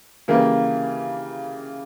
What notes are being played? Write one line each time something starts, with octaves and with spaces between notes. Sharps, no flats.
C#3 E3 G3 A#3